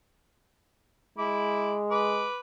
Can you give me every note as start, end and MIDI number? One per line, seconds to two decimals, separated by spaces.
1.18 2.27 56
1.18 1.75 64
1.18 1.75 83
1.18 1.75 86
1.91 2.39 71
1.91 2.39 86